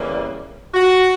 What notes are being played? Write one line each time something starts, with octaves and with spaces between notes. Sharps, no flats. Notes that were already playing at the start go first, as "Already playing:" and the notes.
Already playing: E2 C#3 E3 G3 A#3
F#4